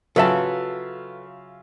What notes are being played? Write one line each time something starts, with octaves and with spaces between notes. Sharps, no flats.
C#3 F#3 F4 A4 B4 E5 A5